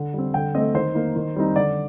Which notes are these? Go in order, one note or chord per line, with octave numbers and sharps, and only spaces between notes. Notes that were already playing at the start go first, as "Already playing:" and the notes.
Already playing: D3
G3 C4
D3 G5
A3 C4 D#5
D#3 C5
A#3 D#4
D#3
G3 C4 D#4
D3 D5